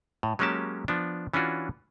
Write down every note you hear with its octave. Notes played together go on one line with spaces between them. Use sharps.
A2
F#3 G#3 A#3 C#4 G4 A5
F3 B3 D4
E3 C#4 D4 F4 F#4